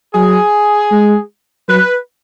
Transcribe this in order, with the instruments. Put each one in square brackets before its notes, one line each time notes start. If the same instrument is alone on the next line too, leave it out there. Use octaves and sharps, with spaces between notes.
[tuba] F#3 [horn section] G#4
[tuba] G#3
[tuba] F#3 [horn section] B4